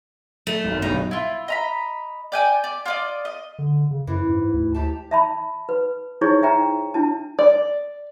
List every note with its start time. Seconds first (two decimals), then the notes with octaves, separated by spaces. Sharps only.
0.47 A3
0.64 G#1 F#2
0.82 B1 G2 B2 D#4
1.11 E4 F4
1.48 D#5 A#5 B5
2.32 D5 G5 G#5
2.64 D5
2.86 F4 D5 D#5
3.25 D#5
3.59 D3
3.91 C#3
4.07 F#2 E3
4.30 G#2
4.53 D2
4.75 G#2 G4 A5
5.11 E5 A5 B5
5.69 B4
6.21 D#4 E4 G#4 C5 C#5 C#6
6.42 D#4 E5 G5 A#5
6.94 D4 E4 A5
7.39 D5